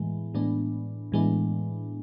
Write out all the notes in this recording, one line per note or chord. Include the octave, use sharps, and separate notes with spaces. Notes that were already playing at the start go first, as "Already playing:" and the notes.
Already playing: A2 E3 G#3 B3
A2 E3 G#3 B3 D4
A2 E3 G#3 B3 D4